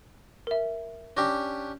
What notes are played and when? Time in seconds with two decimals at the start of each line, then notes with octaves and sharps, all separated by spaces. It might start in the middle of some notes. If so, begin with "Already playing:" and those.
0.47 A#4 E5
1.17 C#4 D4 G4 A#6